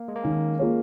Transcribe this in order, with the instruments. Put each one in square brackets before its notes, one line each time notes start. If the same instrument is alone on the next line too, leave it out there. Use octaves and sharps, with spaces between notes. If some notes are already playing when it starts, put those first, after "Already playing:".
Already playing: [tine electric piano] A#3
G#3
A#3
[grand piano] D#3 [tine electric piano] C#4
[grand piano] A#3 F4 G#4 C#5